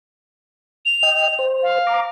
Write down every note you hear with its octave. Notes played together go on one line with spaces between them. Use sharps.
F7
D#5 G5
C5
F5
A#5 D6